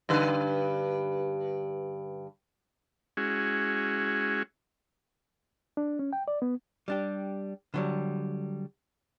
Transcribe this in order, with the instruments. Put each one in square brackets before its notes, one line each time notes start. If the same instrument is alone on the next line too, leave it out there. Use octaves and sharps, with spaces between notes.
[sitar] G2 D3 B4
[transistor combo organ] G#3 C#4 E4 F#4 G#4
[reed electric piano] D4
C#4
G5
D5
B3
[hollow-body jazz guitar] G3 D4 G4
D3 F#3 G3